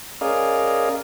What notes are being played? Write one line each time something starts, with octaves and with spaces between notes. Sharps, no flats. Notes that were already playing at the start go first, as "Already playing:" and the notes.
C#4 G#4 A#4 D5 D#5 F5